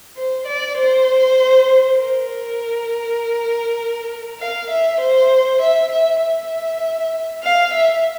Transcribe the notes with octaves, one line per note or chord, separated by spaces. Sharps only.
C5
D5
C5
A#4
F5
E5
C5
E5
E5
E5
F5
E5